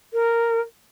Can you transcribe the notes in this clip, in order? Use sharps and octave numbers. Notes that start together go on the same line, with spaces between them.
A#4